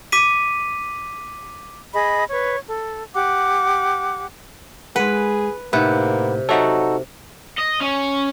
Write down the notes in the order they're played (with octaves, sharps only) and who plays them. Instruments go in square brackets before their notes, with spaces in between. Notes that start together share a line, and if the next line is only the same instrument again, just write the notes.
[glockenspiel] D6 B6 D#7
[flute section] G#4 D#5 B5
B4 C#5
A4
G4 F#5 D6
[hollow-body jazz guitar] G#3 F#5 [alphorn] G#4 [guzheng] B4
[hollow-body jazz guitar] A2 D#4 [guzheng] C3 [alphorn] A#3 [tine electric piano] B4 F#5
[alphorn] F#3 [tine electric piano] D#4 F#4 A4 [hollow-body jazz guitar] C#5 E5 F#5
[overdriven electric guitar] D#5
C#4